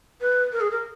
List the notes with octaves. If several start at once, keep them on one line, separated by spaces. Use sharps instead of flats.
B4
A#4
G#4
A#4